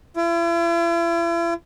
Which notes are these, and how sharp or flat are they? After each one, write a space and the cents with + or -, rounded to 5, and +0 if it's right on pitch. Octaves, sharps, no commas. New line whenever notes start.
E4 +45